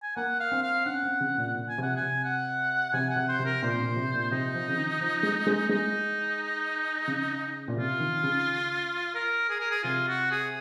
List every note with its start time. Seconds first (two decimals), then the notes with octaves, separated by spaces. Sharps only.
0.03 G#5
0.16 A#3 F#5
0.40 F5
0.52 C4
0.62 F5
0.86 C#4 F#5
1.03 C4
1.20 C#3
1.38 A#2
1.55 A#2
1.68 G#5
1.78 C3 F#5
1.96 G#5
2.01 C3
2.24 F#5
2.93 C3 G#5
3.10 F#5
3.16 C3
3.28 C5
3.39 C3
3.45 A#4
3.63 A#2 C5
3.80 A#2
3.96 C3
4.14 A#2
4.31 C3 D#4
4.54 F3
4.68 C#3
4.78 D#3
5.01 F3
5.23 G#3
5.47 G#3
5.69 G#3 D#4
7.08 C#3
7.68 A#2
7.77 C3 F4
8.00 D#3
8.23 C#3
9.15 A#4
9.50 G#4
9.61 A#4
9.71 G#4
9.84 C3 F4
10.08 F#4
10.31 G#4